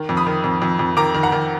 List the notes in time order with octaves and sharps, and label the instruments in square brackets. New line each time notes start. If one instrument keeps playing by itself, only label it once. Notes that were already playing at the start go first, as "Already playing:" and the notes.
Already playing: [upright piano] D#3
F2
B5 D#6
D#3
F2
F2
F2
D#3 A#5 D6
D#3
F#5 A#5
D#3